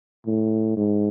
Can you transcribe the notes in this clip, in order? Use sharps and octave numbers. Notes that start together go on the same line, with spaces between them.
A2
G#2